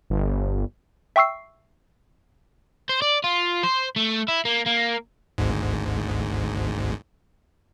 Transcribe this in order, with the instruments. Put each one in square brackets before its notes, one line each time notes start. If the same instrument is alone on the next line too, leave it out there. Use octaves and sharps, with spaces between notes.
[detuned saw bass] G1
[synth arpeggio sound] E5 G5 C#6 E6 C7
[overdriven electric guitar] C5
D5
F4
C5
A3
E4
A#3
A#3
[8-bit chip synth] G#1 D2 G#2